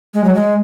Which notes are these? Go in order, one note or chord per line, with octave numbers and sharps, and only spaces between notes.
G#3
F#3
G#3